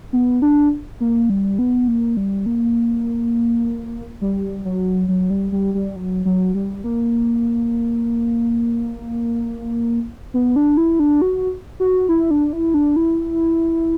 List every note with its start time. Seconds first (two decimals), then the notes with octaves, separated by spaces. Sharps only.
0.13 B3
0.42 D4
1.00 A#3
1.30 G3
1.59 B3
1.88 A#3
2.17 G3
2.46 A#3
4.21 G3
4.65 F#3
5.08 F#3
5.30 G3
5.52 G3
5.74 G3
5.96 F#3
6.25 F#3
6.54 G3
6.84 A#3
10.34 B3
10.56 D4
10.77 E4
10.99 D4
11.22 F#4
11.80 F#4
12.09 E4
12.31 D4
12.53 E4
12.74 D4
12.96 E4